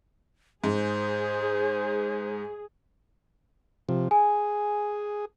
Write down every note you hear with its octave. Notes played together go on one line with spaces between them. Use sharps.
G#2 G#4 C5
C3 F3
G#4 G#5